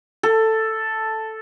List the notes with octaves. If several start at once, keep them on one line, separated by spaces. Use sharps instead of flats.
A4